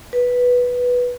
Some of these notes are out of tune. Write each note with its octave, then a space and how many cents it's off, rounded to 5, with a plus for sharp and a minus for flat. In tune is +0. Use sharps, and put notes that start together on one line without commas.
B4 -5